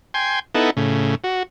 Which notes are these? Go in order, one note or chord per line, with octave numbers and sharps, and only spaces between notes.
G5 G#5 C6
B3 D#4 E4 A4 F#5
A2 C#3
F#4